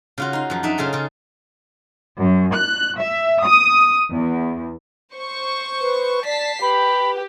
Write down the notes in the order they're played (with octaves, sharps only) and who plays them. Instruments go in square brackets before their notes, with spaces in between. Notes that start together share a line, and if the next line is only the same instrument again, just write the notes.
[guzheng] C#3 F4 F#4
D#4 C6
F#2 F3
D4 D#4 E5
C#3 F4 G#4 A4
C#3 F4
[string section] F#2
F#6
E5
D#6
E2
[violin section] C5 C#6
[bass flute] B4
[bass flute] D5 [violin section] A5 B6 C7
[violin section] G4 [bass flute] B4 [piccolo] B5